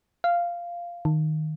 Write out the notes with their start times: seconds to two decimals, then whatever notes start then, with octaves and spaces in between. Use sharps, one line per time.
0.24 F5
1.05 D#3